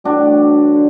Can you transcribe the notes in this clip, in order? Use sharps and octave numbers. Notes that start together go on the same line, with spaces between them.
A2 E3 G3 D4 F#4
D3